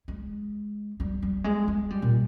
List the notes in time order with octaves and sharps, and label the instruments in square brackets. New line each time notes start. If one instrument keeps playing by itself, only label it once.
[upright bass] G#3
G3
G3
G#3
G#3
G3
A#2